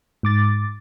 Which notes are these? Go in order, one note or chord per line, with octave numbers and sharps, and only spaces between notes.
G#2 D6 A6